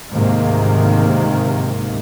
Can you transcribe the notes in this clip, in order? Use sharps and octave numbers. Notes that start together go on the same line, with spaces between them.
D2 G#2 C3 D#3 A#3